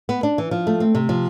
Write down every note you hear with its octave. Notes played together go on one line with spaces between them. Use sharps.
B3
D4
E3
F3
A3
C4
C3
F3